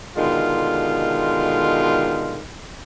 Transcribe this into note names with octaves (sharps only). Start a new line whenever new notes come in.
B2 D3 D#3 G#3 F4